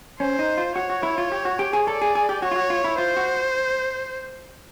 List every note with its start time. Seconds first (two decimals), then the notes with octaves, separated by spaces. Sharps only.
0.20 C#4 C5
0.39 D#4
0.58 F4
0.76 F#4 C#5
0.90 F#4
1.03 E4
1.18 F4
1.32 G4
1.45 F#4
1.59 G4
1.73 G#4
1.87 A4 D5
2.02 G#4
2.15 G#4
2.29 G4
2.42 F#4 C#5
2.51 F4
2.56 F#4
2.70 F4
2.84 E4
2.98 F4 C5
3.17 F#4